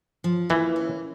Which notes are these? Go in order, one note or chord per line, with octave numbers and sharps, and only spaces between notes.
F3
E3 A#3
C#4